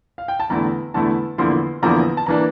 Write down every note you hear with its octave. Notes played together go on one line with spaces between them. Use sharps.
F5
G5
A5
E2 D3 A3 E4 A#5
E2 D3 A3 E4 A5
E2 D3 F3 A#3 E4 C6
E2 D3 F3 A#3 E4 A#5
A5
E3 A#3 D4 A#5